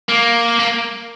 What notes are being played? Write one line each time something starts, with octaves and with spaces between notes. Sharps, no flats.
A#3
A#3